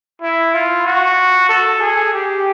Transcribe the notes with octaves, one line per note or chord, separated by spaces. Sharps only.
E4
F4
F#4
A4
G#4
G4